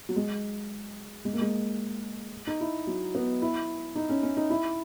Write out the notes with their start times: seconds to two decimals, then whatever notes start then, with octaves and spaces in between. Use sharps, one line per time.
0.09 F#3
0.16 G#3
1.25 G#3
1.33 A#3
1.41 G#3
2.47 D#4
2.60 E4
2.87 F#3
3.15 B3
3.42 E4
3.96 D#4
4.09 C#4
4.23 C#4
4.37 D#4
4.50 E4